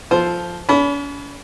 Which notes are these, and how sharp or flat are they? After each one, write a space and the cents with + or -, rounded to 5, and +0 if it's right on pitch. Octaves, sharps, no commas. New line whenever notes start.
F3 +0 A4 +0 C5 +0
C#4 +45 B5 +0